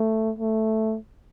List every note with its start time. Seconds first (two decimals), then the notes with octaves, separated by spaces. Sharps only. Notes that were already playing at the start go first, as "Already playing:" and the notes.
Already playing: A3
0.39 A3